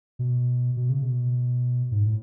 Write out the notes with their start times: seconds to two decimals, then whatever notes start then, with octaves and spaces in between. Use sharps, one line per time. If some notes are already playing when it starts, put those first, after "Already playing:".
0.19 B2
0.77 B2
0.89 C#3
1.02 B2
1.91 G#2
2.06 A2